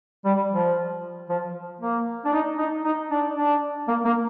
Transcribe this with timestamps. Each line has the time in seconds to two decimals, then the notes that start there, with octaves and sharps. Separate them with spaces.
0.25 G3
0.51 F3
1.29 F3
1.81 A#3
2.25 D4
2.33 D#4
2.58 D#4
2.85 D#4
3.11 D4
3.36 D4
3.88 A#3
4.05 A#3